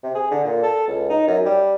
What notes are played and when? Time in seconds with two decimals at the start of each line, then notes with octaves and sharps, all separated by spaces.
0.03 C3
0.15 G#4
0.31 D3
0.44 A#2
0.63 A4
0.88 C#2
1.10 D#4
1.27 F#2
1.45 G3